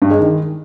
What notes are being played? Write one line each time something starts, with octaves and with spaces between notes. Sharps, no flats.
G2
G#3
D#3